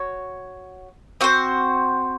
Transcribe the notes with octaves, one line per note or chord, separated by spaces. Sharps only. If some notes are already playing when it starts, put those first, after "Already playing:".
Already playing: F#4 C#5
C4 F#4 C5